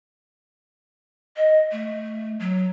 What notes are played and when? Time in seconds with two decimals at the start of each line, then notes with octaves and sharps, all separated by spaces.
1.36 D#5
1.71 A3
2.39 F#3